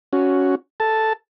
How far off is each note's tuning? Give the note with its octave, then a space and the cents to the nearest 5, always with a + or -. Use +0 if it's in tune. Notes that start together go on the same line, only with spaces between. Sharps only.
C#4 +10 F#4 +0
A4 +0 A5 +0